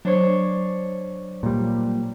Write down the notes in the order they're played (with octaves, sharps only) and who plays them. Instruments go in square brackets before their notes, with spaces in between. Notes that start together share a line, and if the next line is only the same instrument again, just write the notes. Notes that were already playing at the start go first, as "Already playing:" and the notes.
[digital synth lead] F#3 [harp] D4 C5 C#5
[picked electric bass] A#2 G3